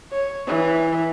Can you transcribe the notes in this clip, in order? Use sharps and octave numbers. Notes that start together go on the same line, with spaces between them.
C#5
E3